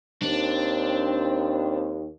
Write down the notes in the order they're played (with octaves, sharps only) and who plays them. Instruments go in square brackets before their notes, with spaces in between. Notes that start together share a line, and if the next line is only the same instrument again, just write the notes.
[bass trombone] D#2 [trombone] C4 [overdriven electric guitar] D4